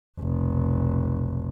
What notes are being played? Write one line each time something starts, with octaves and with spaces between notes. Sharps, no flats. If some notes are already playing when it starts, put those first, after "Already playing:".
F1 B1